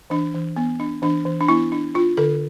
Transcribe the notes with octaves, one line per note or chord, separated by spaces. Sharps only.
E3 D4
E3
B3
D4
E3 D4
E3
D4
B3 E4
D4
D4 F4
D3 A4